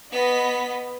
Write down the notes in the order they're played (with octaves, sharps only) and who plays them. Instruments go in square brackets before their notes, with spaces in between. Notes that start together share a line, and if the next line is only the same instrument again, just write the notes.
[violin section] B3 D#5 B6